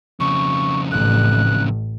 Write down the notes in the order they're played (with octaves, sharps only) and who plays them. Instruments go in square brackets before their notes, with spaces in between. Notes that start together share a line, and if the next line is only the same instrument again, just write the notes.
[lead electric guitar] F2 C#3 [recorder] C#6
[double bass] A1 [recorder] F#6